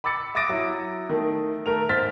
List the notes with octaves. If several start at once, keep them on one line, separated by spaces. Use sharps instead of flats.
B5 D6 E6 A6 C#7
E5 D6 D#6 A6 A#6 D7
F#3 E4
D#3 A3
A3 A#4 F7
G#2 C5 F6 A6 B6